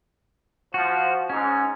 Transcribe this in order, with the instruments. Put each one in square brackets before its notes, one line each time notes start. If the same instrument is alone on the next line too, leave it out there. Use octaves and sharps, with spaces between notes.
[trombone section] F3 [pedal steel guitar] F#4
[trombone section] G#2 [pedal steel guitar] C#4